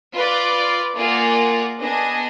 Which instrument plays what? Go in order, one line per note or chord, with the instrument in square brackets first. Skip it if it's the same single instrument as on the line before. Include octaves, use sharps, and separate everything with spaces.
[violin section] F4 B4 D5
A#3 F4 G#4 D5 F#5
B3 D4 G#4 D#5 G#5